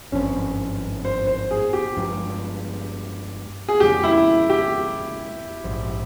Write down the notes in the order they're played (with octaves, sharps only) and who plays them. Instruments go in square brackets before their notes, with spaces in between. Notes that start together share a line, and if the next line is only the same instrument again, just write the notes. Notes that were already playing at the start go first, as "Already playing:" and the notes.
[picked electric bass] G#1 G2 F3 C4 [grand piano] C#4
[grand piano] C5
C5
G#4
G4
[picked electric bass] G1 G2 F3 G#3
[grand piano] G#4
[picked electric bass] F2 C#3 F3 G#3 [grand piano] G4
[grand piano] E4
G4
[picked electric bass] A#1 G#2 F3